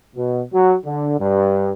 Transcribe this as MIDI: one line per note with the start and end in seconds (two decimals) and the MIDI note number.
0.16 0.41 47
0.53 0.75 54
0.85 1.13 50
1.19 1.72 43